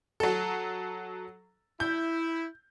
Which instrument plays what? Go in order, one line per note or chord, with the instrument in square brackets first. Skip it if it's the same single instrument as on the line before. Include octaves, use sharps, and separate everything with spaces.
[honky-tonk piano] F#3 A4
[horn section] E4 [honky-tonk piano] G6